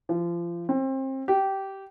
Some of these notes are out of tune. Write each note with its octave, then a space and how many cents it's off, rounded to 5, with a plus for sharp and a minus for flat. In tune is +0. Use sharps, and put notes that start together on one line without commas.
F3 -30
C4 +30
G4 -15